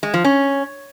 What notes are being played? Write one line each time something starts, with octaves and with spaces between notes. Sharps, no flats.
G#3
F3
C#4